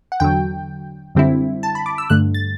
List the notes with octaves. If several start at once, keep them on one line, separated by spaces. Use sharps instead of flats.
F#5
E2 D3 F#3 G5
F#2 D3 G3 C4 E4
A5
B5
D6
E6
G2 D3 A3 F#6
A6